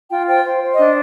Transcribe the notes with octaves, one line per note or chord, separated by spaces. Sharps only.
F4 G5
C5 G5
C5
C5
D#5
D4